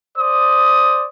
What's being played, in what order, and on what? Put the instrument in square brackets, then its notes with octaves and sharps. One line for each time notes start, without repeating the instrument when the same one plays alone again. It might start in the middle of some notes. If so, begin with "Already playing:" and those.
[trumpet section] C5 D5 D#6